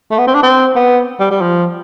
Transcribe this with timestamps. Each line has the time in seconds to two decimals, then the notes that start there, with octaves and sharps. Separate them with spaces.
0.11 A3
0.18 B3
0.27 C4
0.34 D4
0.43 C4
0.76 B3
1.20 G3
1.30 G3
1.41 F3